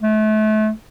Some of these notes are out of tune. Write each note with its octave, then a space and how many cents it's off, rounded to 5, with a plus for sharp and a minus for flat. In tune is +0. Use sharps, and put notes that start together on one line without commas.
A3 -35